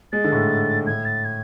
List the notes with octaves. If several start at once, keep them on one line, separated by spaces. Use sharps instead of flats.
G#3 A6
D3
A2
G#2
A2 G#6
A6
G#6